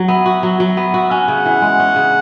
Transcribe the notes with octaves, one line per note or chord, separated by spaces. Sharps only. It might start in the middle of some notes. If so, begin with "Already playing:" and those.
Already playing: F#3
B3 E5
F#4
F#3
F#3
B3
F#4
C#4 F#5
C#3
E3
G#3
C#4
C#3